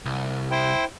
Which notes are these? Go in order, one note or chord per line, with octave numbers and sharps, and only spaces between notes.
C2
E4 C5 G5